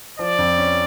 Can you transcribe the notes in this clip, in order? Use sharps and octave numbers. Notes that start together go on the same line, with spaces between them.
F3 D5
F2
C#4